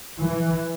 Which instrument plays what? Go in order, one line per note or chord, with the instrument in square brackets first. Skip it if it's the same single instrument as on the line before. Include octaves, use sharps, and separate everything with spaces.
[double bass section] E3